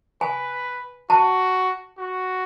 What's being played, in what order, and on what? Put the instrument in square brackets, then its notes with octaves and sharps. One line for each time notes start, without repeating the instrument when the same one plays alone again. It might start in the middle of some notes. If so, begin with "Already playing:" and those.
[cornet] B4 [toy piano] G#5
[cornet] F#4 [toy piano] A5
[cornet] F#4